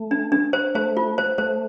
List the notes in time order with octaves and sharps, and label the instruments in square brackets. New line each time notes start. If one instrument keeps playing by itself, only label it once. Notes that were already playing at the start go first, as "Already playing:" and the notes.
Already playing: [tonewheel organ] A3
[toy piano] D4
D4
C5
[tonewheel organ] A3 [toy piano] C5
[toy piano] F4
C5
[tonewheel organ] A3 [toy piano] C5